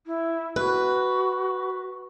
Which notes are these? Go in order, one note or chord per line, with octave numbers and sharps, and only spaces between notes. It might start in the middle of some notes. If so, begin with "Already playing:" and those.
E4
F#4 B4